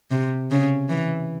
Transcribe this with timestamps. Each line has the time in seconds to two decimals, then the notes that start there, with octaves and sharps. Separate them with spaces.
0.11 C3
0.51 C#3
0.89 E3